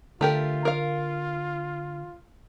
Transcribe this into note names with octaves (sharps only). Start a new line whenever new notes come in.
D3 A3 F4 G4 A#4
A#4 F5